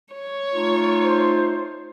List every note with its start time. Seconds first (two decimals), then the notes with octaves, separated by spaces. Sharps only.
0.14 C#5
0.54 A3 D#4 F4
1.03 C5